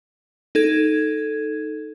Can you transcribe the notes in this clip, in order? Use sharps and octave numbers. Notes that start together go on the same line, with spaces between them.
D#4 A4 G#6